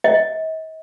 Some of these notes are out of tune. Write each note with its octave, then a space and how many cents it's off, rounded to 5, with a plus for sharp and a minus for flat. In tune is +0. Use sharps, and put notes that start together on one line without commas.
D#5 +45